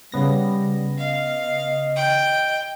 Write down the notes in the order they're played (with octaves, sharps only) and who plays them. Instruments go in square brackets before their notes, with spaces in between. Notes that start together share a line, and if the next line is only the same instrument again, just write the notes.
[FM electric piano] C#3 B3 A#6 [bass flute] G3
[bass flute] D#5 [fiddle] F5
[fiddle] G5